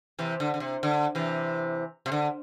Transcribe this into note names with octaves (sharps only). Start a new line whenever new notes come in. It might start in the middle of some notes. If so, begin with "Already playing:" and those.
C3 E3
D3
D3
C3
D3
C3 E3
C3
D3